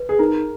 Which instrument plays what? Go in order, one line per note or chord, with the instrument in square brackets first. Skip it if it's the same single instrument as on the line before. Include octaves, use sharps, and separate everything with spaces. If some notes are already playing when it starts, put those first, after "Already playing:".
Already playing: [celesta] B4
[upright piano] G#4
[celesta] D#4 [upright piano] A#4